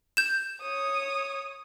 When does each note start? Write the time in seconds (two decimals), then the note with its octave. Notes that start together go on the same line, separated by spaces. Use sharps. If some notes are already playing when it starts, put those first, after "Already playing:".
0.17 G6 E7
0.62 C#5 D#6